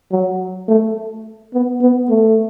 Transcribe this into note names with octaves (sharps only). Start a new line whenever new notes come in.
F#3
A3
B3
B3
A3